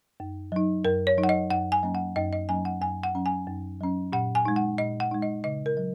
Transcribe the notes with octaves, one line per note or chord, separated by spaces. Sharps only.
F#2
F#3 D#4
F#2 A#4
C#5
F#3 D#4
F#5
D#5
F#2 F#5
G#5
F#3 A#3 C#4
F#5
F#2 D#5
D#5
F#3 A#3 C#4 G#5
F#5
F#2 G#5
F#5
F#3 C#4
G#5
F#2
F#3 C#4
A#2 F#5
G#5
G#3 D#4
F#5
A#2 D#5
F#5
G#3 D#4
D#5
C#3 D#5
A#4
F#3